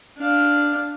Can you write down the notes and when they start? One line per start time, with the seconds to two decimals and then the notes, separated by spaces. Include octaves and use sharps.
0.18 D4 F5